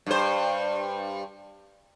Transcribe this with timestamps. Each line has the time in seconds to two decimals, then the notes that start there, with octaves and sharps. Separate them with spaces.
0.06 G2 C5